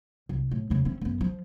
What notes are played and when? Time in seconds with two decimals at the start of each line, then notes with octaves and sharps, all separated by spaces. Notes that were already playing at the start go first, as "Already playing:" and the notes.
0.29 C2
0.51 A2
0.70 E2 C#3
0.85 C4 C#4
1.01 F#2 B3
1.21 F3